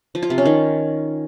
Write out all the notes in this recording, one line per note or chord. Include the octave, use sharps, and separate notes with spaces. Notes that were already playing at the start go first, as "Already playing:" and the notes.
F3
F4
C3
C#4
D#3